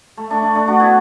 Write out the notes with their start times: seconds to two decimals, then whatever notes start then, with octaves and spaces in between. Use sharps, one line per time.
0.17 A3
0.30 A3 D4
0.42 A3 D4
0.55 A3 D4
0.68 D4 F#4
0.80 B3 E4